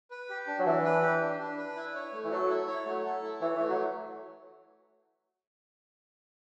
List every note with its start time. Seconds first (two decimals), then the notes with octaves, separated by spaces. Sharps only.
0.11 B4
0.30 G4
0.47 D4
0.59 F#3
0.66 E3 D4
0.84 B4
1.02 G4
1.21 D4
1.39 D4
1.58 B4
1.76 E4
1.95 C#5
2.13 A3
2.25 E3
2.31 F#3 A4
2.50 E4
2.67 C#5
2.86 F#3 A3
3.05 A4
3.23 E4
3.41 E3 C#5
3.55 E3
3.59 A3
3.69 F#3